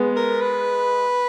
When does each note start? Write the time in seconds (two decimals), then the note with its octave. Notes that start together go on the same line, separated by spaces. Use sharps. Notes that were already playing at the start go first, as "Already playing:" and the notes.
Already playing: G#3 B3
0.16 A#4
0.42 B4